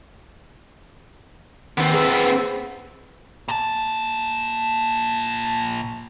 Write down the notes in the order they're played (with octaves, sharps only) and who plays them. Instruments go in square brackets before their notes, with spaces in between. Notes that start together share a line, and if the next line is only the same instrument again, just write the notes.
[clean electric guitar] D#2 [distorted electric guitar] B3 C4
[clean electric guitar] G#4 B4
[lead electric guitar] A#2 A5